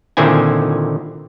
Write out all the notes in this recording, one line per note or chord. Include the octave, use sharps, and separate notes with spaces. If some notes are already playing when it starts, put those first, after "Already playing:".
A#2 D3 D#3 C4 E4 G#5